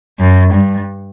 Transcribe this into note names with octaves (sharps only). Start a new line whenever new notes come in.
F#2
G2